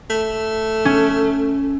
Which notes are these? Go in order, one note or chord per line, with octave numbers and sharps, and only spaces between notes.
A3
C#4